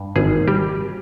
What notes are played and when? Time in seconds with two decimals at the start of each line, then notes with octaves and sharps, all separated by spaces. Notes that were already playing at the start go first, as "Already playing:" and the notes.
Already playing: G2
0.16 G#1 G#4
0.48 G3 G4